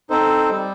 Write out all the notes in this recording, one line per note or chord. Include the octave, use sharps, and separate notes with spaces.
C4 D#4 A4 C5
G3